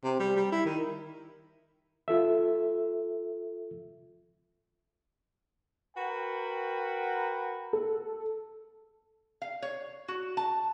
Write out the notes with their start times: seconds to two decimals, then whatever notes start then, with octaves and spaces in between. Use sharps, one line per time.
0.04 C3
0.20 G3
0.36 G3
0.52 E4
0.66 D#3
2.08 F4 A4 E5
5.96 F#4 A#4 B4 F#5 G5
7.73 A4
9.42 F5
9.62 C#5
10.08 F#4
10.37 A5